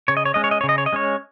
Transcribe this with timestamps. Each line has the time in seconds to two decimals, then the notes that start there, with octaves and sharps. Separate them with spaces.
0.08 C#3 C#5
0.17 D#5
0.25 C#5
0.34 G#3 C#4 D#5
0.44 C#5
0.51 D#5
0.61 C#5
0.64 C#3
0.69 D#5
0.78 C#5
0.86 D#5
0.92 G#3 C#4 C#5